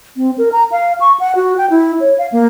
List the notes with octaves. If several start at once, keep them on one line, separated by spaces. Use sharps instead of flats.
C4
A#4
A#5
F5
C#6
F#5
F#4
G5
E4
C#5
F5
A#3